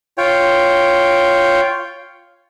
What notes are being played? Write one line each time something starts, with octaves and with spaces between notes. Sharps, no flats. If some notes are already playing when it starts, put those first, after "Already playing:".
F4 C#5 G5